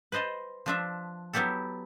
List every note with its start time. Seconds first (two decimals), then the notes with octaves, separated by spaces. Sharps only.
0.12 B4 C5 D#5 A5
0.66 F3 D4 E5
1.33 F#3 B3 E4 G4 A4